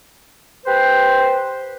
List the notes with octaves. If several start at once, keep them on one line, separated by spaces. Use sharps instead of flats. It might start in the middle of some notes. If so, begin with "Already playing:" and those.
G4 B4 C5